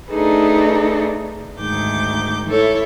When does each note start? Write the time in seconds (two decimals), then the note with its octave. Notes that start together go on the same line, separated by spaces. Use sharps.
0.10 A3 D4 D#4 G#4 A4 B4
1.57 D2 G#2 D#3 D6 G6
2.48 E4 A4 C#5